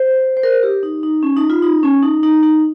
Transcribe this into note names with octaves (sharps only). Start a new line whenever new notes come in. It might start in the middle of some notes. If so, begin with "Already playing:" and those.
Already playing: C5
C5
A#4
G4
D#4
D#4
C#4
D#4
F4
D#4
C#4
D#4
D#4
D#4